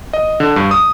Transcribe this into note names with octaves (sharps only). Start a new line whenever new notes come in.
D#5
D3
G2
D#6